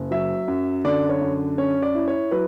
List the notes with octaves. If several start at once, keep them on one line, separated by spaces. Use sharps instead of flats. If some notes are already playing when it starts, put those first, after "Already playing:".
Already playing: F#1
F#3 E5
F#2
D3 D5
C#5
F#2
C#4 C#5
D5
E4
C#5
F#3 B4